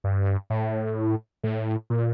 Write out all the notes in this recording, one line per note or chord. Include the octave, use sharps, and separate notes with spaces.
G2
A2
A2
A#2